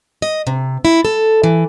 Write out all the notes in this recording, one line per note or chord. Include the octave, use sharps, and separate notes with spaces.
D#5
C3
E4
A4
E3